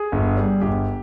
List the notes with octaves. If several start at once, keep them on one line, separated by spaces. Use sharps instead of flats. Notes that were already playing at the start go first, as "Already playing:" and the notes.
Already playing: G#4
G1
G3
G1 G4